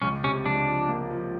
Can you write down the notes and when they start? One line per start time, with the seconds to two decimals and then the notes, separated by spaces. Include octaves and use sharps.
0.02 C#2 C#4
0.24 C3 C#4
0.46 C#2 D4
0.67 F3
0.89 A#3
1.10 F3